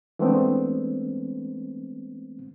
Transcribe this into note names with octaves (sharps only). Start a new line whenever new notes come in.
E3 G#3 A3 B3 C4 D4